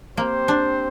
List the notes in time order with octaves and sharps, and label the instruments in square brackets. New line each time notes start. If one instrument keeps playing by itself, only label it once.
[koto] A#3 [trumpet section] C4 G4 C5
[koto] D4